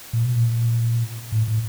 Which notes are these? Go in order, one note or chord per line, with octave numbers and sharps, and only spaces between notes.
A#2
B2
A#2
A2
A2